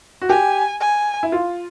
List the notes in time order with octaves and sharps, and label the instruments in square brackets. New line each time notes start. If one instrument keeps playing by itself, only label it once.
[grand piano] F#4
[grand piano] G4 [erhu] G#5
[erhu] G#5
[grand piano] E4
F4